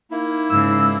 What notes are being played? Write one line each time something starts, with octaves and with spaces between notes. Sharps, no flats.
A#3 D#4 E4
G#2 C#3 E6